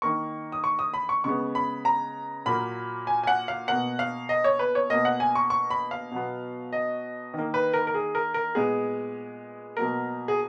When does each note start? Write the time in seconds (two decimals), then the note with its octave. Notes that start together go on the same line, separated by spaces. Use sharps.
0.02 D#3 A#3 C#6
0.52 D#6
0.64 C#6
0.79 D#6
0.94 B5
1.09 C#6
1.24 C#3 G#3 B3 C#6
1.55 B5
1.85 A#5
2.46 A#2 F#3 A#3 B5
3.07 G#5
3.24 G#5
3.27 F#5
3.48 F5
3.68 B2 A#3 F#5
3.99 F5
4.29 D#5
4.44 C#5
4.59 B4
4.75 C#5
4.90 B2 A#3 D#5
5.05 F#5
5.20 G#5
5.35 C#6
5.50 C#6
5.70 B5
5.91 F5
6.11 B2 F#3 B3
6.73 D#5
7.34 D#3 A#3
7.54 B4
7.74 A#4
7.87 A#4
7.94 G#4
8.15 A#4
8.34 A#4
8.55 A#2 G#3 B3 G#4
9.77 B2 F#3 A#3 A#4
10.28 G#4